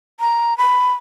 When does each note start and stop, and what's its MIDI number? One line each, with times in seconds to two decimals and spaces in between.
0.20 0.57 82
0.58 0.93 83